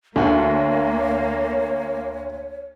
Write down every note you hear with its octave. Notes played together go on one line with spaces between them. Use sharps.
D2 D3 A#3 F#4 C#5